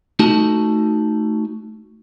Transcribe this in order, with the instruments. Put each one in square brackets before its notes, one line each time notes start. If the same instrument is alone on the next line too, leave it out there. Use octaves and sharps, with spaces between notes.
[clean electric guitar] A3 D#4 F#4 A5